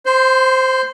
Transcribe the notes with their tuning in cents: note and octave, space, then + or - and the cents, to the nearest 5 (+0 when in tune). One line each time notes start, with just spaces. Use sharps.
C5 +0 C6 -30